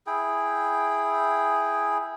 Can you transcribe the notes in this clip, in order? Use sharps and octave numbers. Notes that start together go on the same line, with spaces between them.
E4 G#4 G5